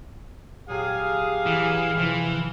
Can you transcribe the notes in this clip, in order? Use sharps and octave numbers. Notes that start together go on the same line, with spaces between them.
A#2 F#3 G4 G#4 F5
E3
C3 E3 F3 F4